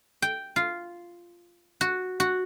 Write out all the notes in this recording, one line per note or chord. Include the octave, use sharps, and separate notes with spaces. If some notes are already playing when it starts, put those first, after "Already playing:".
G5
F4
F#4
F#4